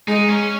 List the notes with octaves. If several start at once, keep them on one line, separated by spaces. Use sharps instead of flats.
G#3 D#4
C#4